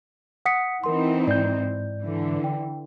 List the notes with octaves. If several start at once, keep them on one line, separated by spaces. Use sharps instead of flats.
F#5 D#6 B6 C#7
E3 C4 D#4 A#4 C6
G#2 D5 G6
D3 E3
G5